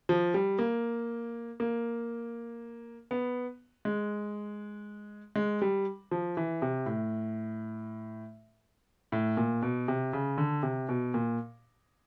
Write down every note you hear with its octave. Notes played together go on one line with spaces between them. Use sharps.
F3
G3
A#3
A#3
B3
G#3
G#3
G3
F3
E3
C3
A2
A2
A#2
B2
C3
C#3
D3
C3
B2
A#2